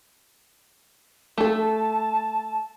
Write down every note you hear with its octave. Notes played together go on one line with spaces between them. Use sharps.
A3 A4 A5